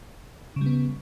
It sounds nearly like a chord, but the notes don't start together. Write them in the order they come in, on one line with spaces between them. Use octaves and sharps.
C#3 G3 B3